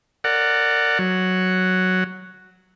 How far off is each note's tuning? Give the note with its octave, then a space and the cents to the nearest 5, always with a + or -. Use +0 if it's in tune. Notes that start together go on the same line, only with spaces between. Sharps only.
A#4 -30 D5 +0 F#5 +0
F#3 +0 F#5 +0